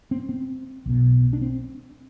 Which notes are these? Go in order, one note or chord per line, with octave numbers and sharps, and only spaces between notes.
C4
C4
B1 B2
D4
C4